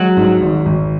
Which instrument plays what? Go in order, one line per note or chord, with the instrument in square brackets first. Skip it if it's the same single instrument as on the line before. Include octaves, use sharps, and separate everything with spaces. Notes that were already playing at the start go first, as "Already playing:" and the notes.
Already playing: [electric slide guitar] F#3 F#4 [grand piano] G#3
[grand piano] G#2
G#1
G#1